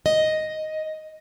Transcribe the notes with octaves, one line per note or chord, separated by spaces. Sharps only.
D#5